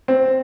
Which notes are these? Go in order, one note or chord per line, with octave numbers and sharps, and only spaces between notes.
C4